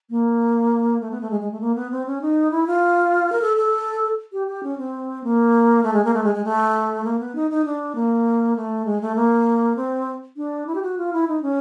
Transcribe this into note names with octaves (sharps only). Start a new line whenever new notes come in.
A#3
A3
B3
A3
G#3
G#3
A3
A#3
B3
C4
C#4
D#4
E4
F4
A#4
A4
A4
G4
G4
C#4
C4
A#3
A3
G#3
A#3
A3
G#3
G#3
A3
A#3
B3
D#4
D#4
D4
A#3
A3
G#3
A3
A#3
C4
D4
E4
G4
F#4
F4
E4
D#4
C#4